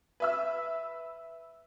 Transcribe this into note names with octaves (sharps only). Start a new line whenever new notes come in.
B4 E5 E6